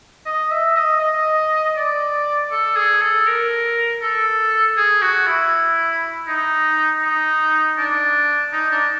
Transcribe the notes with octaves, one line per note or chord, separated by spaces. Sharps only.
D#5
E5
D#5
D#5
D5
A4
G#4
A4
A#4
A4
G#4
F#4
E4
D#4
D#4
D4
D#4
D4